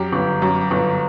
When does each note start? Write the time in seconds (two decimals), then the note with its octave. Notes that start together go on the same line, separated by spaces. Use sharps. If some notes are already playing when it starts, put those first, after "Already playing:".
Already playing: F#2 G4
0.13 G1
0.42 F#2
0.71 G1